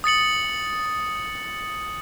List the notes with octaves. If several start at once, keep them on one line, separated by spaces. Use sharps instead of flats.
D#6 A6 C#7 F#7